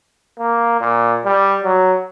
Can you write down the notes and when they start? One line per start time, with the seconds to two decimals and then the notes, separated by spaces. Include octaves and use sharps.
0.39 A#3
0.81 A#2
1.25 G3
1.64 F#3